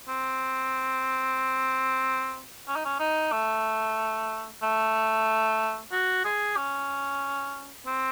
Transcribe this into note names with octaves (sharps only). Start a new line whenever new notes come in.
C4
C#4
D#4
C#4
D#4
A3
A3
F#4
G#4
C#4
C4